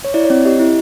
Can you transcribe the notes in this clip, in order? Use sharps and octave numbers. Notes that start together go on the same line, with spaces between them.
C#5
E4 D5
C#5
C4
G4 D#5
E4